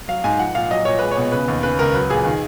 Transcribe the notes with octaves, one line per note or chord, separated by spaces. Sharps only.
F#3 F5
G#2 G#5
F3 F#5
A#2 F5
F#3 D#5
A#2 C#5
G#3 B4
C#5
B2
C#3 B4
D#2
C#3 B4
C#2 A#4
F#3 B4
A#2 G#4
D#3